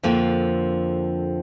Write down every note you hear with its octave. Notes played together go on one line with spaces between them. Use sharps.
F2 D3 F3 A#3